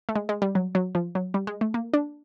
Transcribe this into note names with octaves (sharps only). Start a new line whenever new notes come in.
A3
G#3
G#3
G3
F#3
F#3
F3
F#3
G3
G#3
A3
A#3
D4